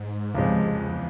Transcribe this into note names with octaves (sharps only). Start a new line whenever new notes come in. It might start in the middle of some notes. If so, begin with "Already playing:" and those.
Already playing: G#2
C#2 G2 C3 F3 G#3
F#2
F2
E2